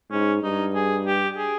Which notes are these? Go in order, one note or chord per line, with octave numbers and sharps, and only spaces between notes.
G#2 C#4
G2 D#4
G#4
G4
G#4